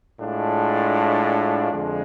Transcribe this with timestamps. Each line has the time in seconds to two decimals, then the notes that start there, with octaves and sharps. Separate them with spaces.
0.20 A2 G#3 D4 F4
1.71 F2 D3 G#3